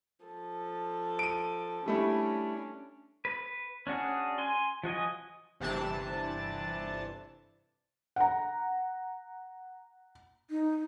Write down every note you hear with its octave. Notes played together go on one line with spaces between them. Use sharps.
F3 A4
D7 D#7
G3 A3 C#4 D4 E4
B4
C#4 D4 F#4 G#4
G#5 C6
F3 F#4 D#5 G#5
G1 C3 E3 D4 A5
F#5 A#5
D#4